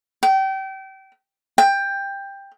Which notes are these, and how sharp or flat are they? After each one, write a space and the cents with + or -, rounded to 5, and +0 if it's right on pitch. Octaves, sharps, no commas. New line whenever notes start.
G5 -30
G5 +15